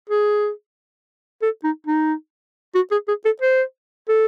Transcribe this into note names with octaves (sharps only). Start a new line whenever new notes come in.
G#4
A4
D#4
D#4
F#4
G#4
G#4
A4
C5
A4